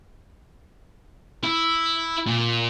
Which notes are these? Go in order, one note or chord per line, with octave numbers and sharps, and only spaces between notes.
E4
A#2